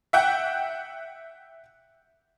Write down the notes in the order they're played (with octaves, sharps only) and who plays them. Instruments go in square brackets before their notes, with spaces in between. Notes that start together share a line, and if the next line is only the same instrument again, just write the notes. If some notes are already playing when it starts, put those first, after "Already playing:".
[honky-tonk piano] E5 F#5 G5 F#6